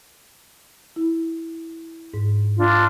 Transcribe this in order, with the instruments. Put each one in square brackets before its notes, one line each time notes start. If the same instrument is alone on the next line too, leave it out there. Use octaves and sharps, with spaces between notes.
[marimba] E4
G#2
[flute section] D4 F4